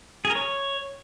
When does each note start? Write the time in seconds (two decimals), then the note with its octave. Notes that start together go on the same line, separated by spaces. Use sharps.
0.25 G#4
0.30 A#4
0.35 C#5